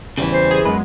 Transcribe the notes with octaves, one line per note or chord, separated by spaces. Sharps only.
E2 C#3 E3 G3 C#4
C5
G#4
F#2 G#3 B3 B4